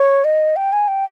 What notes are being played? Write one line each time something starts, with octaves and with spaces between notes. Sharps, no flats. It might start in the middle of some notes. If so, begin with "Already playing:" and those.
Already playing: C#5
D#5
G5
G#5
G5